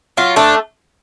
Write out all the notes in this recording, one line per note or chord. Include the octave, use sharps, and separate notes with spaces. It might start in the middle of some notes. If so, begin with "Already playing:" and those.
F#3 F4
A3 D4